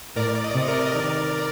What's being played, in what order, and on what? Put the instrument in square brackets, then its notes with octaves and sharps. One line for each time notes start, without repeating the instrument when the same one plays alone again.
[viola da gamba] A2 [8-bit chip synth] A#4 D5
[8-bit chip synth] D5
D#5
D5
[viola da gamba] C3
[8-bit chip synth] D#5
A#4 D5
D#5
[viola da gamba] D#3 [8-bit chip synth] A#4 D5